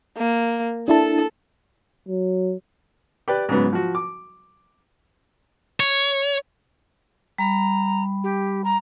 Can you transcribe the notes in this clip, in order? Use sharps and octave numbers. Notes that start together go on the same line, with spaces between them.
A#3
D4 E4 A4 A5
F#3
G4 B4 D5
G#2 C#3 F#3 B3
F3 F#4
D6
C#5
G3 A#5 B5
G4
A#5